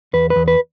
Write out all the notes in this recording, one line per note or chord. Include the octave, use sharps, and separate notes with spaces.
E2 B4
B4
E2
B4